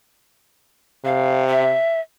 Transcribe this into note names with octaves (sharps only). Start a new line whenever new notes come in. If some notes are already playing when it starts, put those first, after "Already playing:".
C3 F5
E5